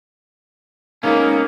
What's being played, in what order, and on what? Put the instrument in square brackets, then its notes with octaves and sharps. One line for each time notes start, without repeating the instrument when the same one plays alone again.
[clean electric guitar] G#3 B3 C#4 [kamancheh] A#3 [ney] D#4